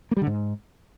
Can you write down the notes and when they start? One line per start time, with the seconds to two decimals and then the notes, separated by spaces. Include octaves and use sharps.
0.11 A#3
0.17 G3
0.22 D3
0.27 G#2